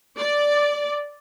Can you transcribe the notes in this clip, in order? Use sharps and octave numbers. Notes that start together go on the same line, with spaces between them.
D5